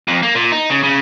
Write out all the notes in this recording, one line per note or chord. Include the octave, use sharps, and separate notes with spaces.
F2
A#3
A#2
D#4
C#3
C#3